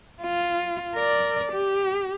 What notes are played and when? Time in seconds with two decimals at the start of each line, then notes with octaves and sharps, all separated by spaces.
0.22 F4
0.95 A#4 D5
1.53 G4